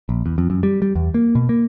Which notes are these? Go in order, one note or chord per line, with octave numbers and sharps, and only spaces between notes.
A#1
E2
F2
F#2
G3
G3
E2
A#3
B2
A#3